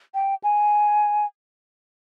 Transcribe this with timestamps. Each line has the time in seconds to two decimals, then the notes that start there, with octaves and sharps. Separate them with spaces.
0.14 G5
0.43 G#5